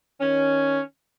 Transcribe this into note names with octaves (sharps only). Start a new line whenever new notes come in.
D#3 C#4